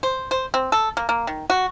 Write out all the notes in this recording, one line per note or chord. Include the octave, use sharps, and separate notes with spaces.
C5
C5
C4
A4
A#3
A#3
D#3
F#4